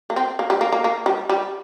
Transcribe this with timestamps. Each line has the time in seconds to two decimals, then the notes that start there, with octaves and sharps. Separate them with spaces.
0.10 A#3
0.16 C4
0.39 A#3
0.50 G3
0.61 A#3
0.72 A#3
0.84 A#3
1.06 G3
1.29 G3